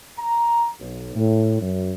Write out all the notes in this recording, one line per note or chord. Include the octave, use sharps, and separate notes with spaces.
A#5
B1
A2
F#2